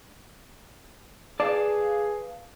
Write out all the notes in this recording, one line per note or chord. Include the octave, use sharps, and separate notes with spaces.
G#4 B4 D5 F5 A5